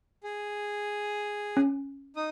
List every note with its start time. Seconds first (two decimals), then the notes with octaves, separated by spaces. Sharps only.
0.24 G#4
1.57 C#4
2.16 D#4 D#6